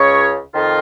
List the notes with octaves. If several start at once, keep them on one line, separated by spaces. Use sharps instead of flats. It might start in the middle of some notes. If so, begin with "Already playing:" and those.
Already playing: C#2 C#3 C#5
F2 D#3 F4